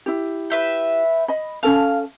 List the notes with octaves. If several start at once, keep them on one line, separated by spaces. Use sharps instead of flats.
E4 G4
B4 E5 G5
D#5 B5
C#4 A4 F5 A5